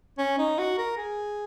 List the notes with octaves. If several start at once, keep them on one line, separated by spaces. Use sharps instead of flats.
C#4
D#4
F#4
A#4
G#4